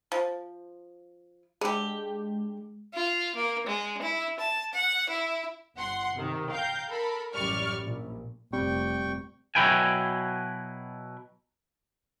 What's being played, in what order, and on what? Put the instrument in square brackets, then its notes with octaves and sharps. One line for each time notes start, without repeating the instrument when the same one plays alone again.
[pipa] F3
[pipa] D3 G4 [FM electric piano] G#3
[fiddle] F4
A#3
G#3
E4
A5
F#5
E4
[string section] G1 F#5 C6
C3 D#3
F5 G5 A#5 G6
A4 A#4 B5
A1 F#2 G3 D5 C#6 F6
A#1
[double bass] F1 [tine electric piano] G3 [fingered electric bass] C4 [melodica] G5 C#6
[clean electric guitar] B2 F#3 E4 B4 G5 G#5